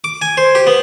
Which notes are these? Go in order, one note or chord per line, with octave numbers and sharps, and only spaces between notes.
D6
G#5
C5
G4
B3